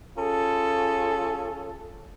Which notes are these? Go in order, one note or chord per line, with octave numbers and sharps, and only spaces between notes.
C#4 F4 G#4 A4